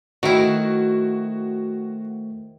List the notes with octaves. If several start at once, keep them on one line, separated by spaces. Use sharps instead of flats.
D#3 A3 E4 F#4 C5